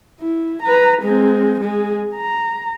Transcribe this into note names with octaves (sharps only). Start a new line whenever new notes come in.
E4
B4 A#5
G#3 C4
G#3 G#4
A#5